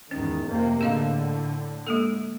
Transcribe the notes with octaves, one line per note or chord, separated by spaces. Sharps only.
E2 G#2 D#3 C#4
F2 C3 A#3
A2 D3 G#4 D#5 F5
G#3 A#3 A4